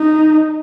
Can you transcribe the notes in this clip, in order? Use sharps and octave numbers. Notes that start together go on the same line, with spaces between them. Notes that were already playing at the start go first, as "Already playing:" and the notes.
Already playing: D#4